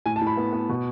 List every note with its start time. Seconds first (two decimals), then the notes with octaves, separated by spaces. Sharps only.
0.06 A2 G#5
0.16 A5
0.21 A2
0.27 B5
0.37 B3
0.53 B3
0.69 B2